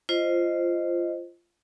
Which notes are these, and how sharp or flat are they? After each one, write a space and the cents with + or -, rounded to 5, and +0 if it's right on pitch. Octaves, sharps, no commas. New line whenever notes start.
F4 -15 C5 +0 D#5 +0